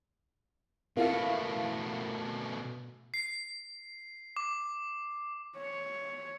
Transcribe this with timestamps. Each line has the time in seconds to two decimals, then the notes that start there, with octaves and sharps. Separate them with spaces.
0.97 B2 A3 A#3 E4 F5
3.14 C7
4.36 D6
5.57 C#5